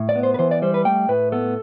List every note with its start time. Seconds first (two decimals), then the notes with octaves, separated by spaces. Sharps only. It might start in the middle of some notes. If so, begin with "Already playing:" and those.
Already playing: A2
0.09 D5
0.15 B3
0.23 C5
0.34 B4
0.39 E3 C5
0.51 D5
0.62 G3 C5
0.74 B4
0.85 A3 G5
1.08 A2 B4
1.32 B3 A4